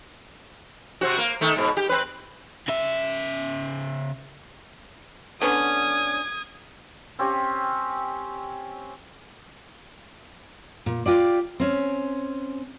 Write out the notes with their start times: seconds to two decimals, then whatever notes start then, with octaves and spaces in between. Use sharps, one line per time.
1.01 C3 C4 F#4
1.18 A#3
1.41 D#3 A3
1.56 G#2 B2
1.77 G4
1.89 C4 B4
2.68 C#3 E5
5.42 D3 B3 C#4 D#6 G#6
7.19 C4 C#4 G4
10.86 A#2
11.06 F4 G4 D5
11.60 C4 C#4